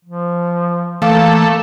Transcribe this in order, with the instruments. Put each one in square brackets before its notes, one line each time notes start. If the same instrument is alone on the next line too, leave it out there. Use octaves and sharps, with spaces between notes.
[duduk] F3
[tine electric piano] E3 D6 [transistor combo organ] A3 [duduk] A#3 [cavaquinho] F5